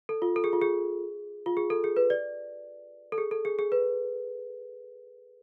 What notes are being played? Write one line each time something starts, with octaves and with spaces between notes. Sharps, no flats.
A4
F4
A4
G#4
F4
G#4
F4
G#4
A4
G#4
B4
D5
A4
G#4
A4
G#4
G#4
B4